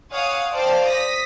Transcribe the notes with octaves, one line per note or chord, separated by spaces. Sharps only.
C#5 F5 F#5 G#5 D#6
C5 D5 F5 G5 A5
D#6 A#6 B6